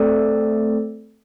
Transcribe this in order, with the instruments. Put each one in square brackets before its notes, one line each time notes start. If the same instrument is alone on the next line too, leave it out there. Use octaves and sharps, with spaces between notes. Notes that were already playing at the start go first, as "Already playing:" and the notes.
Already playing: [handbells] A3 C4 A4 D5